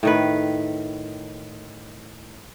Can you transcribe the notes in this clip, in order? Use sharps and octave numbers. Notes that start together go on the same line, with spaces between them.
A2 D#3 B4